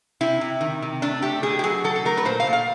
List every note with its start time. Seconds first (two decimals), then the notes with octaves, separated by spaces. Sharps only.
0.21 C3 E4
0.41 C3
0.61 D#3
0.82 C3
1.02 A3 D4
1.22 A3 G4
1.43 B2 G#4
1.59 G4
1.63 F#3 G#4
1.84 F#3 A4
1.96 A4
2.05 A3 A#4
2.17 B4
2.25 A#2 C5
2.40 F5
2.47 A#2
2.53 F5